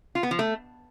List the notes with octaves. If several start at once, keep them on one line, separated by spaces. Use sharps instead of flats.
F4
B3
F3
A3